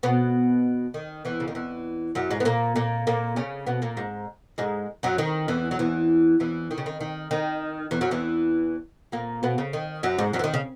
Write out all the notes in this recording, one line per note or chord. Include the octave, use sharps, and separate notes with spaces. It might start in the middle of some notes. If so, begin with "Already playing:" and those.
B2 B3
D#3
E2 E3
C#3
D#3
E2 E3
F#2 F#3
G#2 G#3
B3
A#2 A#3
A#2 A#3
A#2 A#3
C#3 C#4
B2 B3
A#2 A#3
G#2 G#3
G#2 G#3
F#2 F#3
D#3
E2 E3
F#3
E2 E3
E2 E3
D#3
C#3
D#3
D#3
D#3
E2 E3
F#2 F#3
E2 E3
A#2 A#3
B2 B3
C#3
D#3
F#2 F#3
G#2 G#3
F#2 F#3
E3
D#3
C#3